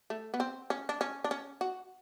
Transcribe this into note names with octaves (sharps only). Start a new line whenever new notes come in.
A3
B3
C4
C#4
D4
C#4
D4
C#4
F#4